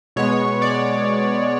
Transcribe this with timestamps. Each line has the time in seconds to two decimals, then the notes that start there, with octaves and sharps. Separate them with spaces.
0.16 B2 G#3 B3 C#5
0.62 D5